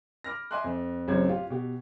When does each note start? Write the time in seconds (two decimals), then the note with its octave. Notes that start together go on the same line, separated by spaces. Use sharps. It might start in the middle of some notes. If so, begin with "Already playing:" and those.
0.24 B5 D6 F6 A#6
0.51 D#5 E5 G#5 C6 D6 F#6
0.64 F2
1.08 A1 F#2 C#3 F#3 C4 G#6
1.29 F4 G4
1.50 B2 G4